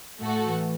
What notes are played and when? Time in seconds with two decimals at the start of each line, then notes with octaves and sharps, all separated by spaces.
0.21 A2 A3 F#4 A4
0.43 E3